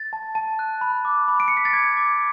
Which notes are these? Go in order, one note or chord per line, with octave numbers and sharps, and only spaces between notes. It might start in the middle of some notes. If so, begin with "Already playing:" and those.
Already playing: A6
A5
A5
F#6
B5
D6
B5
D7
B5 C#7
B6
A6
D6 G#6
D6